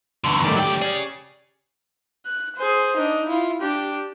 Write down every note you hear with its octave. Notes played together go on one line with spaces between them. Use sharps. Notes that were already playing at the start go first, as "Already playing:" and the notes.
E2 G2 B2 D3 C6 C#6
C#2 G#2 D#3 G3 A3 D5
F#3 G4 G5
C#4 G#4 D5
F#6
G#4 C5
D4 D#4
E4 F4
D4 G4